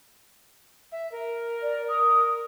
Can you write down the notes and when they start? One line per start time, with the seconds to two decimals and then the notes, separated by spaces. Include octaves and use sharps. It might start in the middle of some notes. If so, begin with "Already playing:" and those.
0.91 E5
1.11 A#4
1.62 D5
1.88 D#6